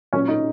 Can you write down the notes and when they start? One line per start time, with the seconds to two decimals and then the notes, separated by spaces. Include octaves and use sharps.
0.13 A#2 F#3 C#4
0.28 D#4